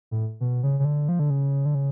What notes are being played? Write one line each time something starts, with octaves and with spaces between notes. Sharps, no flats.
A2
B2
C#3
C#3
D3
F3
D3
C#3
D3
C#3